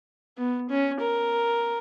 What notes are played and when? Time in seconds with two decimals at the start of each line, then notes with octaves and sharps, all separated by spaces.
0.38 B3
0.70 C#4
1.01 A#4